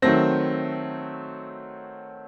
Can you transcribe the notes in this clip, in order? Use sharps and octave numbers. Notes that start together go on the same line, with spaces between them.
D#3 F#3 A3 C4 A#6